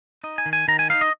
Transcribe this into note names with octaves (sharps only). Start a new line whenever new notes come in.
D#4 D#5
G#5
D#3
G#5
D#3 A#5
G#5
D#4 F5
D#5